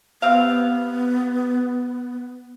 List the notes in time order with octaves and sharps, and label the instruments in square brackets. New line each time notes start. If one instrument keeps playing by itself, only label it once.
[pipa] C3 F5 [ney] B3